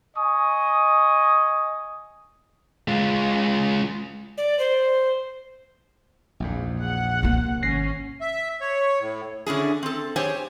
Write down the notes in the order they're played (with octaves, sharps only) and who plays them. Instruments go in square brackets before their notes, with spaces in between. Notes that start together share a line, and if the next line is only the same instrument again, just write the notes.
[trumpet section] D#5 G#5 C#6 D#6
[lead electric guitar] G#3 F4
[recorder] D5
C5
[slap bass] A#1 E2 G#2
[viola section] F#5
[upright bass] C3 A#3
[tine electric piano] G#1 A#6 C7 [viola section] C#4
[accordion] E5
C#5
A2
[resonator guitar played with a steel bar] D3 C#4 E4 G#4
C4 A4
G4 G#4 C5 C#5 G5 G#5